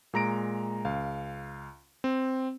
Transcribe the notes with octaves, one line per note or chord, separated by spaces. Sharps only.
A#2 G#3 A#5 A#6 D7
C#2 F5
C4